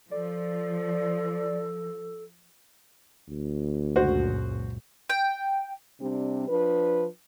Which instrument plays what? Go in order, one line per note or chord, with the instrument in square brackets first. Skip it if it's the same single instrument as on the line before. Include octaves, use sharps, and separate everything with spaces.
[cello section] F3 [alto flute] A4 [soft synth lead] D5
[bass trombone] D2
[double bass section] C#2 F#2 A#2 [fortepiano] F#4 C5
[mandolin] G5
[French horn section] C3 G3 C4 D4
F3 D4 B4